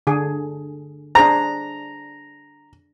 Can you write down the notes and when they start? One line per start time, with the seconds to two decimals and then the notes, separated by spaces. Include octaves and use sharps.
0.07 D3 G#4
1.15 D4 G#4 C5 A#5